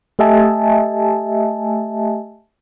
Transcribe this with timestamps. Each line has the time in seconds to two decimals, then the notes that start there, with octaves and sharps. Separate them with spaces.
0.19 A3 G4 D#5 E5 G#5 A5